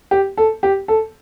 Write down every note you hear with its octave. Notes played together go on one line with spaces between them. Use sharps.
G4
A4
G4
A4